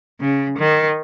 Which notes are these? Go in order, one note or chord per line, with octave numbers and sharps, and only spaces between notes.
C#3
D#3